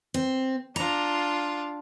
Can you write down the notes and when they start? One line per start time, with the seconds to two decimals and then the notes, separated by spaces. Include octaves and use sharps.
0.14 C4
0.76 D4 F4 A#5